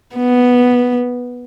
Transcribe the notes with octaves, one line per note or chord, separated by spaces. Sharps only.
B3